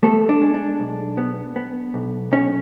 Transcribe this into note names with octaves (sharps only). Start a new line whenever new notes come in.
A3 B3 A4
D4
G#3
D4
B1
B3
B3
B1
B1 C#4